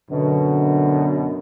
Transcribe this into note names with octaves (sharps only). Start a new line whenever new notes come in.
F#2 B2 D3